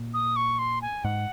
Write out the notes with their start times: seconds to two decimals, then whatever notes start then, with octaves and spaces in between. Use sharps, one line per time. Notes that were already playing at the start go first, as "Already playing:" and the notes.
Already playing: A#2
0.14 D#6
0.36 C#6
0.59 C6
0.82 G#5
1.04 G#2 F#5